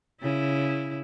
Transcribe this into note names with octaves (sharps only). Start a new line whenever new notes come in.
C#3 E4